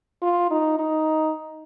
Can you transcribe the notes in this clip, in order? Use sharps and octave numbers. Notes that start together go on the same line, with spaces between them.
F4
D#4
D#4